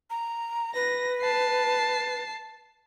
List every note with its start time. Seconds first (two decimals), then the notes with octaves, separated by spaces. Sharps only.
0.10 A#5
0.75 B4 A#6
1.23 A5 C7